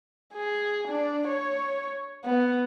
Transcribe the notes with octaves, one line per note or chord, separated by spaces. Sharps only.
G#4
D4
C#5
B3